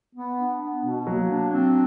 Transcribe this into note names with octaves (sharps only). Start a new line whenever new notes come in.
B3
D4
B3
B2
F#3 A#3
D4
C4